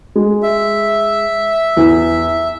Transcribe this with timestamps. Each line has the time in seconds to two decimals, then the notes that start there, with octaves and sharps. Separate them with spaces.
0.15 G#3
0.43 E5
1.77 E2